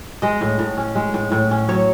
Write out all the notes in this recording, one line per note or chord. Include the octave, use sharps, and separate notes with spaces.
G#3 D#5
A2
A2
C#4
G#3
A2
A2
C#4
F#3 C#5